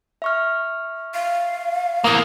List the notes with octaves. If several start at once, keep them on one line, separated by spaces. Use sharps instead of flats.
E5 C#6 F6
F5
E3 A#3 D#6